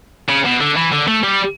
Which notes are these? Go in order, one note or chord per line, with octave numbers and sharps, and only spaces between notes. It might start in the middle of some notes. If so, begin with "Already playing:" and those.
C#3
B2
D3
E3
D3
A3
G3